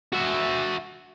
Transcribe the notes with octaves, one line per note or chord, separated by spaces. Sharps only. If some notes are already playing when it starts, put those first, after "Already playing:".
F#4 E5